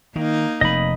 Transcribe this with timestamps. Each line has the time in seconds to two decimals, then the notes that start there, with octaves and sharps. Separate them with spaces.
0.16 D#3 A#3 D#4
0.61 F1 D#5 B5